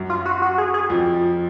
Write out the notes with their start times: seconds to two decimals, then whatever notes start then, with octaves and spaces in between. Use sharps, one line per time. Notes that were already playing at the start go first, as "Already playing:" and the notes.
Already playing: F#2 F#3
0.10 F4
0.25 F#4
0.42 F#4
0.58 G#4
0.74 G#4
0.90 F2 F3